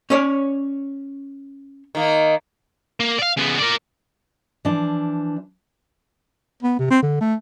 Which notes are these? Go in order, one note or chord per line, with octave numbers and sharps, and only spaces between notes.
C#4 C#5 D5
D#3 A#3
A#3
D5 F5
C#3 B3
A#4 D5
E3 F3 D4
B3
C3
C4
D3
A3